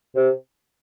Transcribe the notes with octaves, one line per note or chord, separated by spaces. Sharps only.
C3